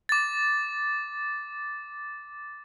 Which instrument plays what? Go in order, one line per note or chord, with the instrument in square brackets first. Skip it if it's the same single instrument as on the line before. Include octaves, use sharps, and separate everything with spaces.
[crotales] D6 A6